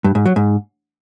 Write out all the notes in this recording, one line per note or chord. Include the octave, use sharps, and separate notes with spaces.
G2
G#2
F#3
G#2